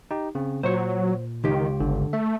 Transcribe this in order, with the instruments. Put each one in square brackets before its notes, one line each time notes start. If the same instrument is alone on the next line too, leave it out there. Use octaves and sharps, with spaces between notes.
[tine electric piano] D#4 G4
C#3 C4
[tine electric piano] A#2 [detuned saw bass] F#3 [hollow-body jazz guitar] C5 C#5
[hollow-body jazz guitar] C#2 G4 [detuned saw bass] D#3
[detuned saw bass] G1 [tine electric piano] D3
[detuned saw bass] A3 [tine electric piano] E5